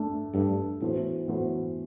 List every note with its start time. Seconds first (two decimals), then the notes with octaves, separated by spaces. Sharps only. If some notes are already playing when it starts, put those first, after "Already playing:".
Already playing: A3 D4 A4
0.34 G2 A3 D4 A4
0.81 A2 E3 B3 F#4 C5
1.28 A2 E3 B3 F#4 C5